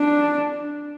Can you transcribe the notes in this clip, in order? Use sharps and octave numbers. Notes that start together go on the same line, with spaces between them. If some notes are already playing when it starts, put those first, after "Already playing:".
Already playing: D4